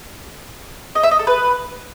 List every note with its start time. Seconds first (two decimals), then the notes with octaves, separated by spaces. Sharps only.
0.95 D#5
1.03 E5
1.11 D#5
1.19 A4
1.27 B4